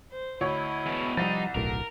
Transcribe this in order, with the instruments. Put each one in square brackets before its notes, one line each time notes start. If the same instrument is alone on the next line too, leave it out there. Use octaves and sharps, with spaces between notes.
[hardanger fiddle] C5
[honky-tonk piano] D2 C#5 [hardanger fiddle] E4 D#5
[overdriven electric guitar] E2 B2
[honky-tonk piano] C2 A6 [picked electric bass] F3 G3 [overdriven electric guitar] D#4
[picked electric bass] D1 B1 A2 [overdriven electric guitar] A#4